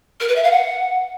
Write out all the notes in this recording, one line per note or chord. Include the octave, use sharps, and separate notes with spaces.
A#4
B4
E5
F5
F#5